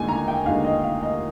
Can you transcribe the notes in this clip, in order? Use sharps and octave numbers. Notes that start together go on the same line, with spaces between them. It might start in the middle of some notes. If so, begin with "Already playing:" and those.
Already playing: D#2 D3 G#3 G#5
A#5
G5
D#2 D3 G#3 F5
D#5
F5
D#5